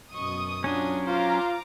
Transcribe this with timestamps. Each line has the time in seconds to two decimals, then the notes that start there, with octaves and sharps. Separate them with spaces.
0.13 F#2 B2 D#5 C#6 D#6
0.64 F#3 C#4 D4 F4
1.08 F4 C5 F5 A#5 D6